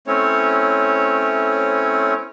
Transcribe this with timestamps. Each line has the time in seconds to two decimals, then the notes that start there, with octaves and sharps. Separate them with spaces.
0.07 A3 C4 C#4 E4 C#5